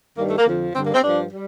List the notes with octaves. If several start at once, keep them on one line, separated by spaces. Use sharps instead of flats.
G2 D#3 G3 A#3
A3
A#3
F2 D3 F3
G2 D3 G3 C4
A#3
C4
G2 F3 D4
G3